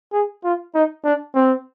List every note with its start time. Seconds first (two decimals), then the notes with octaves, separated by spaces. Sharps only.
0.13 G#4
0.44 F4
0.74 D#4
1.04 D4
1.35 C4